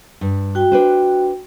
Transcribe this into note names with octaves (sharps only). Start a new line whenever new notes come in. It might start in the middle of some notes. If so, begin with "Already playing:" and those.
G2
F#4 G5
D4 B4 C5